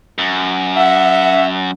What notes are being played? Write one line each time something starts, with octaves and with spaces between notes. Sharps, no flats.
F#2
E5 F#5